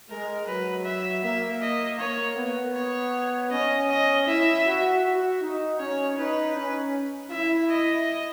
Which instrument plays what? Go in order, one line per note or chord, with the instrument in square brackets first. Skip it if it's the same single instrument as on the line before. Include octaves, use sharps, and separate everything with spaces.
[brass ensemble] G#3 [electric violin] A#4
[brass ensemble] F#3 [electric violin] B4
[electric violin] E5
[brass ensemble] A#3 [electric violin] E5
[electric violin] D#5
[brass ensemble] A#3 [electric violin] C#5
[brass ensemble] B3
[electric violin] C#5
[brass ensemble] C#4 [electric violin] D#5
[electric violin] D#5
[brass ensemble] E4 [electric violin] E5
[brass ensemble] F#4
F#4
D#4
[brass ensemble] C#4 [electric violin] C#5
[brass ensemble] D#4 [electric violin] B4
[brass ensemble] C#4
[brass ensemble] E4 [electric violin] E5
[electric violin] D#5